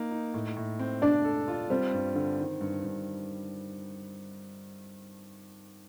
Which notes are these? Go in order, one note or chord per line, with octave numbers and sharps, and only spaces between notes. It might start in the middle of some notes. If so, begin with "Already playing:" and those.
Already playing: A#3 D#4 A#4
D#4
A2
A2
C4
D4 D5
A4
F4
G3 C4
G2
D3
D#3
G2
G2